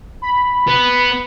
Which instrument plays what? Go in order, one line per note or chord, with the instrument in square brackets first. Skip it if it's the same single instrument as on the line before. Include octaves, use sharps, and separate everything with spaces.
[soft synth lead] B5
[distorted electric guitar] B3